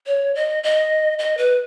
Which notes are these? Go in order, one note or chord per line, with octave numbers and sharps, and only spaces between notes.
C#5
D#5
D#5
D#5
B4